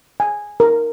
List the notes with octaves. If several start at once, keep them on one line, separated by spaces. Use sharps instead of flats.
G#5
A#4